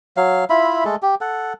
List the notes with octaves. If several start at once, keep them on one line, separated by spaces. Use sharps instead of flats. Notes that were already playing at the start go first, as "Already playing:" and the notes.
F#3 F5
E4 F4 E5 B5
G#3 A3 A4
G4
A4 F#5